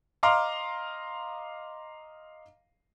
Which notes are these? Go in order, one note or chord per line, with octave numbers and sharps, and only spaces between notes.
D#5 F5 A#5 C6 D6 F6